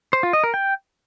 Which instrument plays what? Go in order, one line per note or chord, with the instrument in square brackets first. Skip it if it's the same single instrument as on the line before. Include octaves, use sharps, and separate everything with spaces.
[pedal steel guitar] C5
F4
D#5
A#4
G5